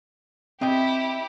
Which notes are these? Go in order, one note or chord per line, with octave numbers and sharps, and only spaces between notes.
C4 E4 G4 D#5 G5